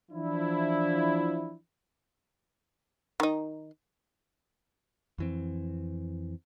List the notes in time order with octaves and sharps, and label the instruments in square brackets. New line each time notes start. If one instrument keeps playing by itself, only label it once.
[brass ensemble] E3 F3 D4 E4
[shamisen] D#3 D#4
[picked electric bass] F2 E3 C4